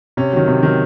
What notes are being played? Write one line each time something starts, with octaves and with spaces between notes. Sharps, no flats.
C3 C#4
D#3 F#3
C3
D#3 F#3